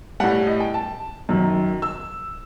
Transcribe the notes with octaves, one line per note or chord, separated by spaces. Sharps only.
A2 G3 F#5
D#5
G5
A5
F#2 D#3 F#3
E6